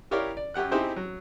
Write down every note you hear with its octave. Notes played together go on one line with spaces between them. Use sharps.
E4 G4 A#4 C#5 D5 F5
D5
F#2 C#4 G4 F#5 F#6
C4 D#4 E4 G4 G#4 C5
F#3